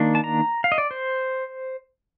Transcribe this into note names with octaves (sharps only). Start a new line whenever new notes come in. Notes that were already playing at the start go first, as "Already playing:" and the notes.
Already playing: D#3 A#3 D4
A5
A#5
F5
D#5
D5
C5